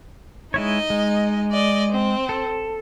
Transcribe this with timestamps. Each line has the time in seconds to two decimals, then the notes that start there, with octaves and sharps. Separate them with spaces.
0.54 G#3 D#4 E4 C#5 D#5
0.90 G#3
1.51 D5 D#5
1.92 C4
2.29 A4